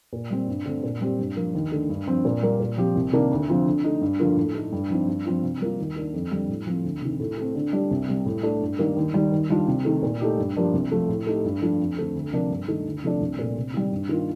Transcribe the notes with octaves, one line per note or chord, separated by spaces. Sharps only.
A#2
G3 C4
G2
D3 A3 C4
A#2
G3 C4 G4
G2
F3 A#3
D#2
D3 A3
G2
F3 C4
A#2
G3 A#3
A#2
F3 C4 G4
C2
C3 D#3 A#3 D4
D2
D3 F3 C4 F4
D3
A3 D#4
G2
D3 F3 A#3 F4
A2
A3 D#4
G2
F3 C4 D#4
G2
F3 C4 F4
C3
G3 A#3 F4
D#2
D#3 A#3 D4
F2
D3 G3
A2
F3 C4
D2
C3 D#3
A2
A3 C4
D3
G3 D4 G4
C2
C3 G3
A2
A3 D4
G2
D#3 G3 A#3
D#2
D#3 G3
D#2
D#3 G3 D4 F4
C3
D#3 A3
A#2
A3 D#4 G4
G2
F3 A#3 D4 G4
C2
C3 F3 A3 C4
A2
A3 D#4 G4
G2
F3 A3 D4 F4
F2
D3 A3 C4
D2
C3 F3 A#3 D4
G2
D#3 A3 D#4
D2
C3 F3 A3 D4
C2
A#2 A3
C3
D#3 G3
G2
D#3 A#3 F4